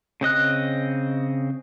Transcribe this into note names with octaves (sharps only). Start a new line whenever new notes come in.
C#3 C4 D#5 F#6